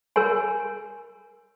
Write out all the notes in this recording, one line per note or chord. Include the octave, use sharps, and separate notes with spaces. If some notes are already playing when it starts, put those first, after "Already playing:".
A#4 C#5 G#5